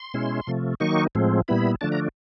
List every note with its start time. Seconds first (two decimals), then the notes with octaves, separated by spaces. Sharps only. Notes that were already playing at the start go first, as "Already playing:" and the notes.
Already playing: C6
0.14 B2 G#3 C#4 E4
0.47 C3 F3 A3
0.80 D#3 F#3 A#3 D#4 C#6
1.15 A2 F3 G#3 C4
1.48 A#2 G3 B3 E4 B5
1.81 D3 F3 A3 D4 A5
1.92 A#5